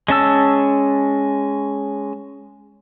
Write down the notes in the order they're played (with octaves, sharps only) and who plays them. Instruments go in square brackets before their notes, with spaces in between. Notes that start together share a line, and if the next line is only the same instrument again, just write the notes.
[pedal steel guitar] G#3 C#4 A5 E6